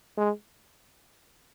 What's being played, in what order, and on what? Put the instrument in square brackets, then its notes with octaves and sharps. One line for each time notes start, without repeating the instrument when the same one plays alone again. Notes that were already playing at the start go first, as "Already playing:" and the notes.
[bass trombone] G#3